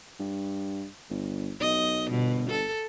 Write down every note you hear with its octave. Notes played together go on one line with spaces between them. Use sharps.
G2
G1
B1 D#5
G1 B2
A4